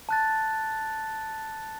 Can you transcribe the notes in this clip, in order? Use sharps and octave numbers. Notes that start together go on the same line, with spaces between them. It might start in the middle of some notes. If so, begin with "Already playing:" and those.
A5 F#6 A6